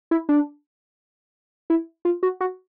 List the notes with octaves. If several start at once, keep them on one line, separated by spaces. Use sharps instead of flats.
E4
D4
E4
F4
F#4
F#4